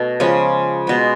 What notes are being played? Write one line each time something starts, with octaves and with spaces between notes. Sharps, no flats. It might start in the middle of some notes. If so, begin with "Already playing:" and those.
Already playing: B2 A3
C#3 F3 G#3 C#4
B2 G#3 B3